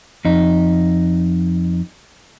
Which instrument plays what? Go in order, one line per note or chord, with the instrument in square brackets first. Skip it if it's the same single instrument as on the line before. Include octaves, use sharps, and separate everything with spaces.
[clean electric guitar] F2 D#4